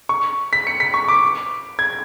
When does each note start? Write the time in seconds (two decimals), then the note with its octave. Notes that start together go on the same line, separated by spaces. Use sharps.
0.09 C#6
0.53 B6
0.67 C#7
0.80 B6
0.94 C#6
1.08 D6
1.79 G#6